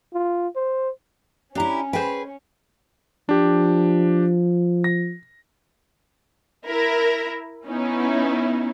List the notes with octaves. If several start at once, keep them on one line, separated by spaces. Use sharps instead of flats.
F4
C5
C#4 D4 E4 G4 A#5
G#4 B4 C5 D#5 G5
F3 D4 G4
A#6
E4 A#4
B3 C#4 D#4 E4